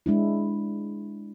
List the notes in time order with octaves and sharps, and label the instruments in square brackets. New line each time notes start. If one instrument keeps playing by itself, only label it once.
[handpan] G#3 D4 E4